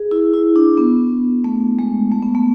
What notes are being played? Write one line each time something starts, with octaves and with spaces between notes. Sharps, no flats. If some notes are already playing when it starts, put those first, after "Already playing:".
Already playing: G#4
E4
E4
D4
B3
A3
G#3
A3
B3
A3